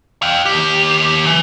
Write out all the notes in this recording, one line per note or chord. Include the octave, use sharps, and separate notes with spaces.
F5 G5
D#2 G4
E3